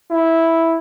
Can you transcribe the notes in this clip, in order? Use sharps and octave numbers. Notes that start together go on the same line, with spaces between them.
E4